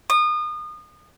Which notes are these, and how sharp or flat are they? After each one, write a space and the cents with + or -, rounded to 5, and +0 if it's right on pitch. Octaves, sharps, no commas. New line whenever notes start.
D#6 -30